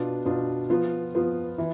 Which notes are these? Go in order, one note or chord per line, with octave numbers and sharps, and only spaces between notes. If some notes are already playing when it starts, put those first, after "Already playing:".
Already playing: B2 B3 D4 F4
B2 B3 D4 F4
F3 B3 F4
F3 B3 F4
E3